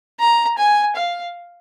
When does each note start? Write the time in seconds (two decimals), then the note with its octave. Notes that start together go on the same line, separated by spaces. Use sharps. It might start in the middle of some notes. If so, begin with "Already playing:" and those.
0.20 A#5
0.58 G#5
0.96 F5